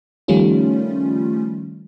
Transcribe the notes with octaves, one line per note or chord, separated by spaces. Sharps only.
D#3 F3 G3 A3 C#4 F4